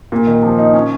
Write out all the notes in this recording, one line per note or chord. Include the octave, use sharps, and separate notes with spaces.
A#2
D#3
F3
D#4
C#4